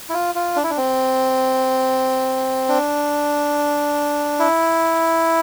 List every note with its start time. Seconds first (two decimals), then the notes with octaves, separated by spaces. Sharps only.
0.09 E4
0.14 F4
0.35 F4
0.56 D4
0.63 E4
0.70 D4
0.77 C4
2.69 D4
4.40 E4